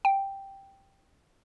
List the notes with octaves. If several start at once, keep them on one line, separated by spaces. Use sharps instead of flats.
G5